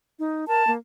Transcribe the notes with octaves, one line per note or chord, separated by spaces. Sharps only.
D#4
A#4 A5
A#3